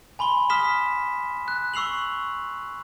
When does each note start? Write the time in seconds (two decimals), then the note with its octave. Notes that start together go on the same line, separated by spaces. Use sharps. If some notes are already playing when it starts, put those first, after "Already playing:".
0.19 G#5 B5 C6 G7
0.50 D#6 F6 B6 E7 G7
1.48 F#6
1.74 C#6 E6 C7 F7 F#7